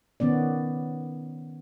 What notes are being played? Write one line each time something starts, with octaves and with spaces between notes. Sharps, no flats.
D#3 B3 C#4 D5